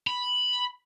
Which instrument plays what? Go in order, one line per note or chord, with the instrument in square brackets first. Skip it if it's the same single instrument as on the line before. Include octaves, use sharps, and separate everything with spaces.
[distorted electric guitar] B5